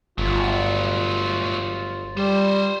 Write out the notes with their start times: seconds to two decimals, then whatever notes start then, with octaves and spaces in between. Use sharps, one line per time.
0.18 G1 F#3 A3 F4
2.17 G3 B4 C5